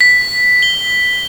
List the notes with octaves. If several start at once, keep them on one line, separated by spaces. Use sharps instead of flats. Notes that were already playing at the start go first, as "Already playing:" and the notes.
B6
G7